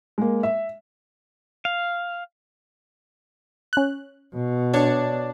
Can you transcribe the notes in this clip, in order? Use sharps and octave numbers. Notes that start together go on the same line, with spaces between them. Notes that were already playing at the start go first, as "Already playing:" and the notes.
G#3 A#3
E5
F5
C#4 F#6
B2
D4 C#5